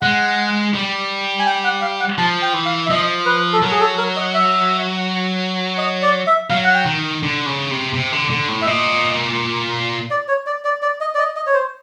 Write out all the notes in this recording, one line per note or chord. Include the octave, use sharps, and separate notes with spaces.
G#3 F#5
G3
G#5
G5
F#5
F5
F#5
F3 A5
G5
E3
F5
E5
F3 D#5
B4
A4
F#3 A#4
G#4
A4
A#4
D#5
E5
D#5
D5
E5
F#3 F5
F#5
G5
D#3
D3
C#3
C3
C3
D3
D3
A2
E5
A#2 D#5
D5
C#5
D5
D5
D5
D#5
D5
D#5
D#5
C#5
C5